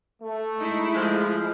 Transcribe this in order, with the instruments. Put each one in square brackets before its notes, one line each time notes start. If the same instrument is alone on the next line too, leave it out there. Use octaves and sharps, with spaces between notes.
[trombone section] A3
[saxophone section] G#3 D#4 [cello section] E4
[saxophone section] F3 G#3